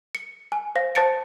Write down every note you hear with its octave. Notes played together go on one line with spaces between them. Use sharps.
C#7
G#5
C5 F5 A#6
C5 A5 A6 C#7 D7